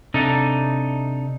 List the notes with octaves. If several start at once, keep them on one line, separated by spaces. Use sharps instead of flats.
C3 D4 D#4 A4